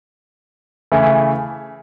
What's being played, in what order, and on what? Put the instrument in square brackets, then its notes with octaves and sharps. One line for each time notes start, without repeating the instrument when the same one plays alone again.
[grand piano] C#3 E3 A3 E4